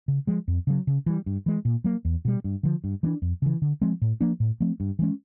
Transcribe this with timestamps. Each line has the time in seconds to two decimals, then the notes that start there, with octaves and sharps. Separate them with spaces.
0.08 C#3
0.27 F3 G#3
0.48 F2
0.67 C#3 F#3
0.87 C#3
1.06 E3 G3
1.26 G2
1.46 E3 G#3
1.65 A#2
1.84 F#3 A#3
2.05 E2
2.25 B2 G3
2.44 G2
2.63 D3 F3
2.84 G2
3.03 E3 A3
3.06 D4
3.22 F2
3.42 C#3 E3
3.62 D3
3.81 F3 G#3 C4
4.02 A2
4.21 F3 A#3 D4
4.40 A2
4.60 F3 A3 C4
4.80 G2
4.99 E3 G#3 C#4